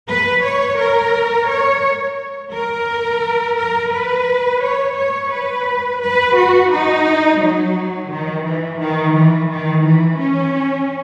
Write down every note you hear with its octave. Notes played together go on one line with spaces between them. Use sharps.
B4
C#5
A#4
C#5
A#4
A#4
B4
C#5
C#5
B4
B4
F#4
D#4
F#3
D#3
E3
D#3
E3
D#3
E3
C#4